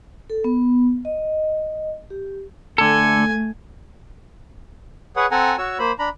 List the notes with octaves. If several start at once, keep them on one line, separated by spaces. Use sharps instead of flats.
A4
B3
D#5
G4
D3 A3 A4 G#5
G#4 B4 C#5 F#5
C4 A4 F#5 G#5 A#5
F#4 C#5 E6
A#3 C5 B5
D4 A#5 B5